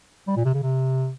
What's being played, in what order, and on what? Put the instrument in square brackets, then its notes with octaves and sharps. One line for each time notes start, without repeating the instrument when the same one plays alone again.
[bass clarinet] G3
A#2
C3
C#3
C3